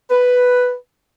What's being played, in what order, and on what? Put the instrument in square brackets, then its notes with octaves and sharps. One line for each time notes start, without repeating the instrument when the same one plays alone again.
[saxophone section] B4